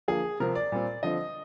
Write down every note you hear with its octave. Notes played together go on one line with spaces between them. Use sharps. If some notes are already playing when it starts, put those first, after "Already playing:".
D3 F3 A#3 G#4
C3 F3 C4 A#4
D5
A#2 G3 C4
D3 F3 C4 D#5